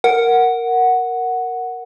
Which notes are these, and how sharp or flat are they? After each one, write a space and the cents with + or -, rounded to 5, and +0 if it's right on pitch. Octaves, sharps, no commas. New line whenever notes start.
A#4 +0 F#5 +0